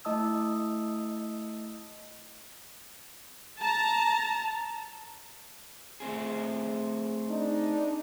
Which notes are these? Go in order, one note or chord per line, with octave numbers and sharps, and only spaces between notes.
A3 E4 D#5 A5 D#6 E6
A5 A#5
A3 C4 G#4
D4 D#4